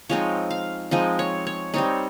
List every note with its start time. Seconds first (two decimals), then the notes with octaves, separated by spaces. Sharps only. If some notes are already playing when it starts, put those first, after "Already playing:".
0.09 F3 G#3 C4 D#4 C#5
0.50 F5
0.91 F3 G#3 C4 D#4 D#5
1.19 C#5
1.47 C#5
1.74 G3 C4 D#4 C#5